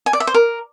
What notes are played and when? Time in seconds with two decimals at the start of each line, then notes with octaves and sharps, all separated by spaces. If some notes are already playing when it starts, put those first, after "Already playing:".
0.06 G#5
0.13 D5
0.20 E5
0.27 C5
0.34 A#4